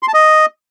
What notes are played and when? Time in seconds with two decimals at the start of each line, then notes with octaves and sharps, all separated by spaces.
0.03 C6
0.08 A5
0.14 D#5